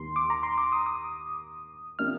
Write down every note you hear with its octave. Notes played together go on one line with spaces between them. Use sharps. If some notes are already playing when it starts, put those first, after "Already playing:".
Already playing: D#2 D#3 A#3 C6
D6
A#5
C6
D6
D#6
D#6
C3 F3 A#3 D4 G4 F6